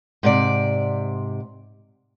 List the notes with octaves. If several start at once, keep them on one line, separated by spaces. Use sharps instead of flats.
G#2 C3 D5